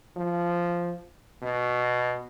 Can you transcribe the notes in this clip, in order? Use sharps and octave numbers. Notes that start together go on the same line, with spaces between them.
F3
B2